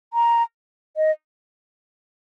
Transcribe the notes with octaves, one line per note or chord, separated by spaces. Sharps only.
A#5
D#5